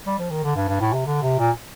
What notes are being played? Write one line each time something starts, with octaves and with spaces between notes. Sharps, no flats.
G3
F3
D#3
D3
G2
G2
A2
C3
D3
C3
A#2